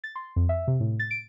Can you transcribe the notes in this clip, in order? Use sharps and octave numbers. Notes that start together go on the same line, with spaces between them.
A6
C6
F2
E5
C3
A2
A6
D7